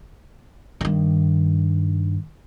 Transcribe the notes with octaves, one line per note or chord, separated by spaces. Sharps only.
G2 D#3